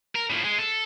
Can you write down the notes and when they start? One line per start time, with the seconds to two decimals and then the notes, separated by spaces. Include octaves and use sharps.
0.15 A#4
0.30 A2 F3
0.44 G#3
0.58 A4